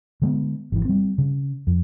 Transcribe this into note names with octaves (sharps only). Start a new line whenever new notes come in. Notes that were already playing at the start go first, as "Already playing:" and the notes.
D3 G#3 B3
G#1 E3
G3 C4
C#3
F2